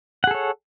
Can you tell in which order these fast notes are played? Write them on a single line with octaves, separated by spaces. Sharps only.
F#5 G#4 A4 C#5